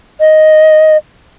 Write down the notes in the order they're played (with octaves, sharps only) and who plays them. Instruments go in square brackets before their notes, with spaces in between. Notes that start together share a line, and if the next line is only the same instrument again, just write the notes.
[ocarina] D#5